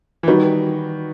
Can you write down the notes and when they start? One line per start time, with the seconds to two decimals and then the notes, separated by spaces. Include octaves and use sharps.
0.23 E3
0.28 D#3 G3 D#4 F#4 B4